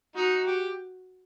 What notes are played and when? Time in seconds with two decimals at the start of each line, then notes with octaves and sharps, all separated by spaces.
0.16 D#4 F#4
0.47 G4